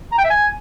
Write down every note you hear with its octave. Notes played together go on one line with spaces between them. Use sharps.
A#5
G5
E5
G#5